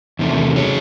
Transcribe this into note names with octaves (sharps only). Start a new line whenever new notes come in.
E2 C3 D#3 A3
F#3 C#4 G#4 C#5